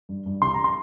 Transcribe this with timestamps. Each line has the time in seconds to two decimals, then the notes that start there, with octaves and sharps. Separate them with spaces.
0.09 G2
0.26 G2
0.42 C2 C6
0.54 A#5
0.64 C6